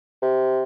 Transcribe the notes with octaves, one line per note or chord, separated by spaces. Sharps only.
C3